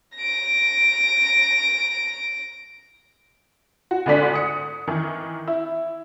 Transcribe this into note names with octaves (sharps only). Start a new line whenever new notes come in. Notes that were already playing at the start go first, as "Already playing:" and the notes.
A#6 D7
F#4
D2 G#2 D3 D4 B6
D#6 C#7
D#3 E3
E4